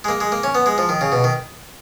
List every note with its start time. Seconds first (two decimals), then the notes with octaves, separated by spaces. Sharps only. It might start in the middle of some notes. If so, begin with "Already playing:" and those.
0.04 G#3
0.08 A#3
0.20 G#3
0.32 A#3
0.44 C#4
0.55 B3
0.66 G#3
0.78 F3
0.89 D#3
1.01 C#3
1.12 B2
1.24 D#3